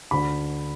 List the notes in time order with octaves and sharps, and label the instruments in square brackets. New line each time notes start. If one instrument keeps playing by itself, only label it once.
[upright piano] D2 D3 B5